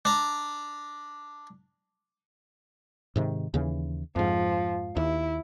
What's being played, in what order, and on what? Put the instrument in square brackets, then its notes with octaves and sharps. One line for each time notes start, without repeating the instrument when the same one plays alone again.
[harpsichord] D4 A#5
[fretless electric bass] G#2 C3 D#3
D#2 C#3 E3
[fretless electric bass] F2 G#2 [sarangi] F3
[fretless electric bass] D#2 [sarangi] E4